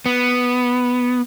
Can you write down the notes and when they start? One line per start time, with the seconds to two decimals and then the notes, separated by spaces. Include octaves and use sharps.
0.06 B3